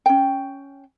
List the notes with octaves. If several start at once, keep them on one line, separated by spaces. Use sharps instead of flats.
C#4 G5